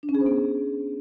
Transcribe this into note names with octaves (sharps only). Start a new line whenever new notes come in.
D4
C#4
G#4
C5
B3